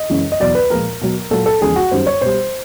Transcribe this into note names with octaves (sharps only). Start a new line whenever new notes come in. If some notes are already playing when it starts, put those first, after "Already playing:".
Already playing: D#5
F#2 C#3 E3 G#3
D#5
E2 B2 F#3 D5
B4
A#2 F3 G#3 A#4
B2 F#3
A#2 F#3 A4
A4
E2 C#3 F3 G#3 G#4
F#4
F#2 D#3 G3 C5
C#5
B2 G3 C5